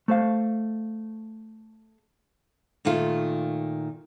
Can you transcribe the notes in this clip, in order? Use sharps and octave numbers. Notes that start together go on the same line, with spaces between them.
A3 C5 F5
A#2 D#3 A3 F4